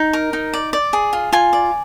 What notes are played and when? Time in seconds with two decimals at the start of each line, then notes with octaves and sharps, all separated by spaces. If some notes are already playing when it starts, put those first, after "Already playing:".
Already playing: D#4
0.13 A#4
0.33 D#4
0.53 D5
0.73 D5
0.93 G#4
1.13 F4
1.33 F4 G#5
1.53 D5